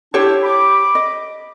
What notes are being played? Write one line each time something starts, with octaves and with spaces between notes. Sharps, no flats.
D4 E4 G4 C5 C#5
B5 D6
D#5